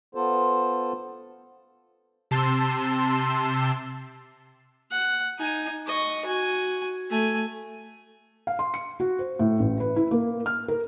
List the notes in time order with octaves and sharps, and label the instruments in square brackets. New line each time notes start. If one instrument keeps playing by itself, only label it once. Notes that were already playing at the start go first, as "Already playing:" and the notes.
[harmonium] B3 F4 A4 C5
[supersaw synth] C3 A5 C6 E6
[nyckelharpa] F#5
D#4 G#5
D#5 C#6
F#4 G#5
A3 G#5
[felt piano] F5
C6
C#7
F#4
C5
A2
A1
B4
E4
A#3
F6
A#4